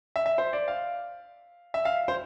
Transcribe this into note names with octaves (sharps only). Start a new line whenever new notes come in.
E5
E5
C5
D5
F5
E5
F5
C5